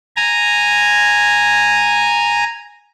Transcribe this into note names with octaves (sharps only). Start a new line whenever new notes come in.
G#5 A#5